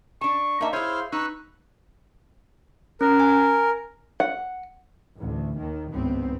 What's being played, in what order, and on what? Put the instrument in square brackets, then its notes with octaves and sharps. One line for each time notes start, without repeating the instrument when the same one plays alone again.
[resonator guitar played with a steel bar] D4 A5 [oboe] C#6
[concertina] A#3 D4 [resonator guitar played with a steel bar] D#4 E5
[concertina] E4 C5 F5 [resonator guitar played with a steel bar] G#4 C#5 [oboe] C6
[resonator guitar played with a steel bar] D#4 [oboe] B4 [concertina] C#6 E6 F#6
[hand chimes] C#4 [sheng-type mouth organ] A#4
[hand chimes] G#5
[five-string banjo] F#5
[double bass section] A1 D2
D#2 D#3
G#1 C#2 G2 B3 C4